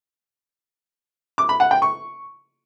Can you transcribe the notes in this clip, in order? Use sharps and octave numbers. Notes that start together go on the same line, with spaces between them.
D6
B5
F#5
G5
C#6